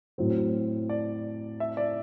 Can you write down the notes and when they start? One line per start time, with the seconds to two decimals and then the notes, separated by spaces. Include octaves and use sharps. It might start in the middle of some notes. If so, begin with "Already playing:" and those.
0.18 A2 F#3 C4
0.89 D5
1.60 E5
1.77 D5